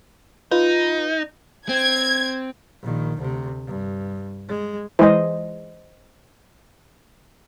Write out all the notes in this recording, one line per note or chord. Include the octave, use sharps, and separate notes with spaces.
D#4 F4 B4
C4 G#6
A#1 D#3
D2 C3
G2
G#3
E3 G#3 C5 D#5